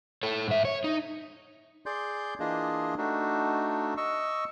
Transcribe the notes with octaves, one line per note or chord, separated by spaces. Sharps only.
A4 C#5
G#2 E5
C#5
D#4
G#4 D5 C6 G6
E3 A#3 D4 F4 G#4 D#5
A3 D4 D#4 F#4
D#5 C#6 E6